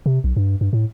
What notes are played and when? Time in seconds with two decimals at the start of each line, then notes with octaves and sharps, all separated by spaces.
0.06 C3
0.24 B1
0.36 G2
0.61 G2
0.73 A2